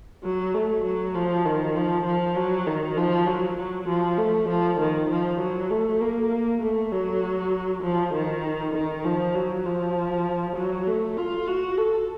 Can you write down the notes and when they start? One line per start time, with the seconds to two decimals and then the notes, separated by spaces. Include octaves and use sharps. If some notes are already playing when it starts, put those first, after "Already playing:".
0.24 F#3
0.54 A3
0.85 F#3
1.15 F3
1.45 D#3
1.76 F3
2.06 F3
2.36 F#3
2.67 D#3
2.97 F3
3.27 F#3
3.58 F#3
3.88 F3
4.18 A3
4.49 F3
4.80 D#3
5.10 F3
5.40 F#3
5.70 A3
6.01 A#3
6.62 A3
6.92 F#3
7.83 F3
8.14 D#3
8.74 D#3
9.05 F3
9.35 F#3
9.65 F3
10.56 F#3
10.87 A3
11.17 F4
11.48 F#4
11.78 A4